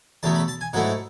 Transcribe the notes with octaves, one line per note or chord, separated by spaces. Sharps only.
E2 C#3 F#3 A3 A5
B5
A5
G#5
G#2 F#3 A3 E4 F#5